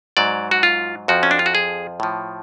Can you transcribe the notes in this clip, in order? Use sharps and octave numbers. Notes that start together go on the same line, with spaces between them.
G#2 F#3 D5
F#4
F4
F2 F3 F#4
C#4
D4
F4
F#4
G#4
A2 F3